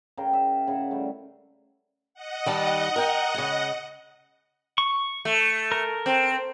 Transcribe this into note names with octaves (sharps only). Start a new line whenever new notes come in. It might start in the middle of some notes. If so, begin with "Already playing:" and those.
C#3 A#4 G5
E5
C#3 F#5
G3 A3
D#5 F#5
D#3 G3 A5
A#4 G5
C#3 G#3
C#6
A3
A#4
C4